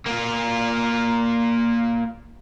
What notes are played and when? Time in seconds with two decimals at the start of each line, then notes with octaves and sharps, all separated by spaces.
0.06 A#3 F4